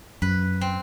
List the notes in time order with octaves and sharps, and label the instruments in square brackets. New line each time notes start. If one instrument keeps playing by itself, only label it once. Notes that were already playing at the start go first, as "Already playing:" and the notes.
[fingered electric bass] F#2 [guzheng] B4
[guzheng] C4